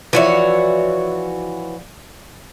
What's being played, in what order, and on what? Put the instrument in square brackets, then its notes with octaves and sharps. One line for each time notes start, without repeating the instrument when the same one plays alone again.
[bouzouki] E3 F#4 C#5 [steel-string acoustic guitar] F3 D5 E5